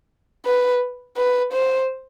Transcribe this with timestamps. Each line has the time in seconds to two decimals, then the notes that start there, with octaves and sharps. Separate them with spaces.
0.45 B4
1.17 B4
1.52 C5